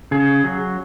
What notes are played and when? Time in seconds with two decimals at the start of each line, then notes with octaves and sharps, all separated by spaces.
0.11 C#3 G#4
0.44 F#3